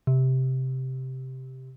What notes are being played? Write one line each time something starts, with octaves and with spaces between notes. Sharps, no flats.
C3